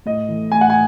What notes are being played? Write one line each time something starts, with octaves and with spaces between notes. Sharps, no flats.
A2 D#5
E3 A3
A2 G#5
F#5
G#5